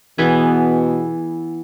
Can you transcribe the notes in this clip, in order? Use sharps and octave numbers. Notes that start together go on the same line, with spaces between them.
B2 E3 B3 E4 G#4